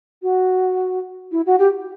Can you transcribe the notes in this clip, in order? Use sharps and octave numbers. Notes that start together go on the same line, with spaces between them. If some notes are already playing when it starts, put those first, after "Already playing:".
F#4
E4
F#4
G4